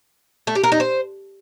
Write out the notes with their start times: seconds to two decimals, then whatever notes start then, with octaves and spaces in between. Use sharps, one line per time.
0.47 A3
0.55 G4
0.64 A#4
0.72 D#4
0.80 C5